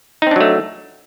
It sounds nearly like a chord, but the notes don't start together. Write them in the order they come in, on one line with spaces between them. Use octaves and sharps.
D#4 C4 D4 F#3 A3